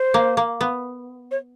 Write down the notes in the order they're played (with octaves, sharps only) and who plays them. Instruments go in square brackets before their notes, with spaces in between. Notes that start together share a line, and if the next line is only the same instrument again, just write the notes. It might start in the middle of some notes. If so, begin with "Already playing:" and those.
Already playing: [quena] C5
[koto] A#3
A#3
B3
[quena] C#5